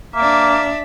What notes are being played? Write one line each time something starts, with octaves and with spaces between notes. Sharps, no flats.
A#3 D4 E5